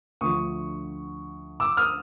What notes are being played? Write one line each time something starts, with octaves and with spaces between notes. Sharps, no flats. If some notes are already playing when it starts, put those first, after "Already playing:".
D2 D3 F3 C#6 D#6
D6 E6
D#6 F6